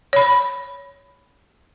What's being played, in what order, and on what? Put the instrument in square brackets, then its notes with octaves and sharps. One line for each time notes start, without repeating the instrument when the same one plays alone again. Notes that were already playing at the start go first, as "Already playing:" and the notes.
[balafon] C#5 B5